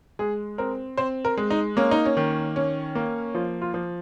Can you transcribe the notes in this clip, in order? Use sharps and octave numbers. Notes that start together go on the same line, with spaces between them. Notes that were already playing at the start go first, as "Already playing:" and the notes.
G#3 G#4
C4 A#4
C4 C5
A#4
G#3
D#4
A#3 C#4
D#4
C#4
D#3
C#4
A#3
F3 F4
F4
F3